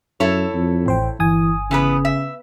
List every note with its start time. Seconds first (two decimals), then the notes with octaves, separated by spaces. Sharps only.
0.20 F#2 E4 A4 C#5
0.54 F2
0.86 A1 C5 G5
1.20 G1 E3 G#5 D#6
1.71 C#3 E3 B3 B4
2.05 E5